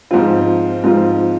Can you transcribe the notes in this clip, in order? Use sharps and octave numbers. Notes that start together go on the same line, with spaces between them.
G#2 F3 C4 F4
G#2 F3 C4 F4